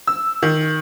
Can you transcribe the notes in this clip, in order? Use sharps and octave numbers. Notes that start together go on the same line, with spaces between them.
E6
D#3